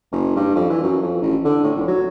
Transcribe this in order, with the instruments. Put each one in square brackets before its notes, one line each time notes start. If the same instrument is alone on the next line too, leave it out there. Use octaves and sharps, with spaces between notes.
[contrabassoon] F#1
G2
F2
E3
F#2
F2
A1
D3
A2
F1
F#3